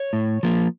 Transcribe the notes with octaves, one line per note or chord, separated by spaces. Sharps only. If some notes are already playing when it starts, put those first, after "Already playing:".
Already playing: C#5
A2
F3 A#3